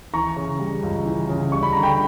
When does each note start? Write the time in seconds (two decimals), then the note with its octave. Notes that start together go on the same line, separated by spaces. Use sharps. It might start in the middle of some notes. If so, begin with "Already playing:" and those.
0.14 E3 A#5 C#6
0.36 C#3
0.60 G3
0.83 C#2
1.05 E3
1.29 C#3
1.52 G3 C#6
1.63 B5
1.73 D3 A#5
1.83 G5 B5